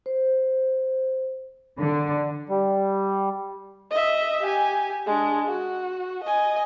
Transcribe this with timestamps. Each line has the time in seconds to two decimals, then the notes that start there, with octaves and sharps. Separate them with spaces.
0.06 C5
1.80 D3
2.49 G3
3.90 D#5 E5
4.42 G4 G#5
5.06 G#3 D4
5.47 F#4
6.24 D#5 G#5